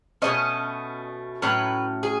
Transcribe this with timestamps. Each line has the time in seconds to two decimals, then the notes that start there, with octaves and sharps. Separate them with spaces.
0.22 B2 A3 C#4 D#5
1.42 A2 F#3 C#4 B4
2.03 G#4